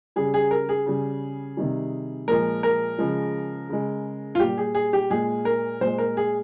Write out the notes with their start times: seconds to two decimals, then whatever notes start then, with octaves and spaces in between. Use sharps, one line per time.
0.16 C#3 G3 G#4
0.34 G#4
0.51 A#4
0.69 G#4
0.86 C#3 G3
1.57 C3 D#3 G3
2.28 A#2 F3 G#3 A#4
2.63 A#4
2.98 C#3 F3 G#3
3.69 C#3 G#3
4.35 F4
4.40 A#2 G3 G4
4.57 G#4
4.75 G#4
4.93 G4
5.10 A#2 G#3 G#4
5.45 A#4
5.81 A#2 G#3 C5
5.98 A#4
6.17 G#4